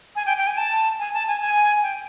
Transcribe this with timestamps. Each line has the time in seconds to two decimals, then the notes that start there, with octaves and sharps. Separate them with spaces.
0.16 G#5
0.26 G5
0.37 G5
0.47 G#5
0.57 A5
0.99 G#5
1.13 A5
1.27 G#5
1.41 G#5
1.82 G5